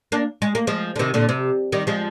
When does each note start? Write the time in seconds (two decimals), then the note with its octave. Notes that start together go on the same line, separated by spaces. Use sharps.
0.12 A#3 D4
0.42 G#3
0.55 A#3
0.67 F3 G#3
0.96 D3
0.99 C3 D#3
1.14 A#2 D3
1.29 C3
1.72 D#3 G3
1.87 F3 G#3